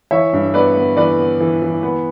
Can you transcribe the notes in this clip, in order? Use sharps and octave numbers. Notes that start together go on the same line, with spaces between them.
E3 C#5 E5
G2
B3 B4 D5
B3
E3 B4 D5
B3
E3
E3
B3